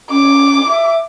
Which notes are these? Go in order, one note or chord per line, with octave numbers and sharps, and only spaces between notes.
C#4 D6
E5